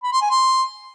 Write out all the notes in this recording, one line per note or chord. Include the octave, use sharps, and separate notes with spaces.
B5
C6
G#5
C6